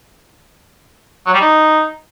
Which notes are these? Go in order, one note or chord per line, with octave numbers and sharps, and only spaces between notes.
F#3
G3
D#4